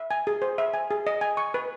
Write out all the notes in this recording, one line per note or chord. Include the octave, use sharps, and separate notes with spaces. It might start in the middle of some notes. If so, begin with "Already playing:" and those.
Already playing: E5
G#5
G#4
C5
E5
G#5
G#4
D#5
G#5
C#6
B4